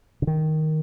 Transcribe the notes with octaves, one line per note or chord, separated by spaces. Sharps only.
C#3
D#3